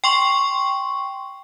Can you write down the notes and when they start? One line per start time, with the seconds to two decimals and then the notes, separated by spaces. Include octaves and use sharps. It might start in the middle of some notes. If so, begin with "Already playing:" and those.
0.04 G5 C6 C#6